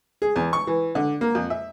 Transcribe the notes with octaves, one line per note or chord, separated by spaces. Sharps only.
G#4
E2
C#6
E3
D3
A#3
F2
E5